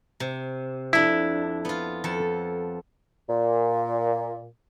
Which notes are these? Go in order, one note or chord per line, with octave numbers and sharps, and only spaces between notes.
C3
F2 D4 E4
B3 F4
F2 A4
A#2